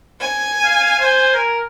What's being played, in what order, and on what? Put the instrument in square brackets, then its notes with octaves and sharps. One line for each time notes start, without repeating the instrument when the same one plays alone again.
[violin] G#5
[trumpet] F5
C5
A#4